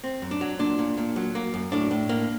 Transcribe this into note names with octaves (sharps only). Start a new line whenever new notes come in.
C4
F#2
D4
F#3
A#2 D4
A#2
A#2
F#3
A#3
F#2
A2 D4
A2
A#3